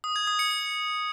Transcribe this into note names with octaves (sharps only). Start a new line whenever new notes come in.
D#6
G#6
D#6
C#7
C#7